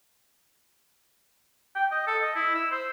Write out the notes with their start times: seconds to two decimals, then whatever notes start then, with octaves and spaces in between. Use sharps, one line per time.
1.75 G5
1.92 D#5
2.07 A4
2.22 D#5
2.36 E4
2.55 E6
2.72 C5